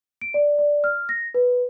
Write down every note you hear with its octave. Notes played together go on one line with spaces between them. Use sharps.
D7
D5
D5
F6
A#6
B4